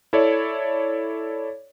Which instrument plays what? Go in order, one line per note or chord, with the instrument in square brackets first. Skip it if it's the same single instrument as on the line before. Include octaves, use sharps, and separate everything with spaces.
[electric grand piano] E4 A4 C#5 D5